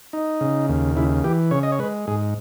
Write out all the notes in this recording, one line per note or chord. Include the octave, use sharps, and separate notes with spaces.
D#4
C#3
D#2
C#3 E4
E3 G4
C#3 C#5
D#5
C#5
G#3 B4
G#2 G#4